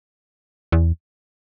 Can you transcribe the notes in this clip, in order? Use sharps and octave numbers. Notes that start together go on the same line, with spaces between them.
E2